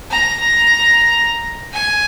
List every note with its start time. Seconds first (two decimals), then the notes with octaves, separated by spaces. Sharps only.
0.10 A#5
1.72 G#5